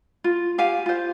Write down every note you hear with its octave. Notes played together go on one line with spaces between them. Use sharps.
F4
G4 F5 G#5
F4 C5